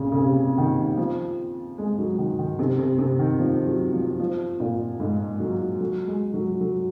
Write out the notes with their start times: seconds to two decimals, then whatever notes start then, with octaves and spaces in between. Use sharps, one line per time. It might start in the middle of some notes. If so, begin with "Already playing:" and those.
Already playing: A#2 C#3
0.12 C#3
0.18 C3
0.58 D#3
0.98 F3
1.78 G#3
1.99 F#3
2.18 D#3
2.39 D#3
2.59 C3
2.79 C3
2.98 C3
3.19 D#3
3.39 F3
3.66 F#3
3.93 F3
4.20 F3
4.60 A#2
5.00 G#2
5.40 F#3
5.80 F#3
6.07 G#3
6.34 F#3
6.61 F#3